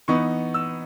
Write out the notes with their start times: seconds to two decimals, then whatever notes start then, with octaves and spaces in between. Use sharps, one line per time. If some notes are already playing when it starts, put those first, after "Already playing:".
0.08 E3 B3 D#4 C#6
0.54 E6